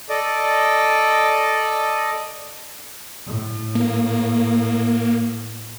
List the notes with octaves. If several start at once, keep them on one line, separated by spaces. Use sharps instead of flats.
A4 D5 D#5
A2
A#3